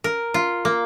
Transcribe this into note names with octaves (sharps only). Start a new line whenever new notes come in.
A#4
F4
A#3